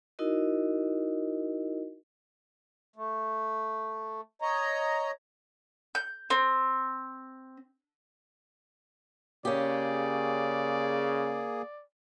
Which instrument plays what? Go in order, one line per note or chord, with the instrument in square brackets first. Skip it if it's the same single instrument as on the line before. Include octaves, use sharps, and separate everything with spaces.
[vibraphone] D#4 E4 F#4 A#4 D#5
[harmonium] A3
C#5 D#5 A#5
[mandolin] G6
C4
[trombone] C#3 [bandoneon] A#3 G#4 [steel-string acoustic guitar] C#4 G4 [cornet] D5